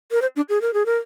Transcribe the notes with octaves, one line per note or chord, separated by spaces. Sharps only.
A#4
C5
D4
G#4
A#4
G#4
A#4